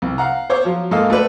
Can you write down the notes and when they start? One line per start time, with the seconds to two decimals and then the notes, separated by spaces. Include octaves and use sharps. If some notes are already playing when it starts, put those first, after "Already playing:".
0.02 C2
0.18 F5 F#5 A#5
0.50 C5 C#5 D6
0.65 F3 F#3 F4
0.91 G#2 A#3 A4 D#5 F5 E6
1.10 A3 F#4 A4 B4 D5